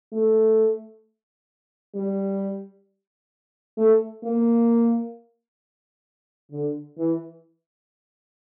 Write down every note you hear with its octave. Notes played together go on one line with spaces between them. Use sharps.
A3
G3
A3
A#3
D3
E3